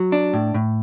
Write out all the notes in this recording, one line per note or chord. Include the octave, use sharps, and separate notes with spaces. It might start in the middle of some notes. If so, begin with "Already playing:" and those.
Already playing: F#3
D4
A2
A2